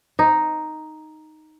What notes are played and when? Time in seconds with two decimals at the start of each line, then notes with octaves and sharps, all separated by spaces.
0.19 D#4